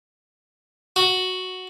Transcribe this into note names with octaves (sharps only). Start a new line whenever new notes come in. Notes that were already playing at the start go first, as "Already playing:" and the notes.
F#4